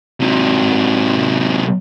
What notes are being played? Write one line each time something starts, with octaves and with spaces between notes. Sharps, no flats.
C3 F#3